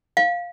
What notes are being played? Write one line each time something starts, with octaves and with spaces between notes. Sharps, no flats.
F5